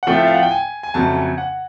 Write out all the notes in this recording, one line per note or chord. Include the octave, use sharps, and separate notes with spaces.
F#5
A2 F3 A3 C4 G5
E5
F5
F#5
G5
G#5
G#5
F2 C#3 F#3 A3 A5
G#5
F#5